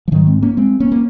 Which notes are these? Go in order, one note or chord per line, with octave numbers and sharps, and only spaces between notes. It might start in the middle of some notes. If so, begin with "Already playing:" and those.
F3
G#2 D#3 F#3
G#3 C4
A#3 C#4
G#3 C4
A#3 C#4
A#3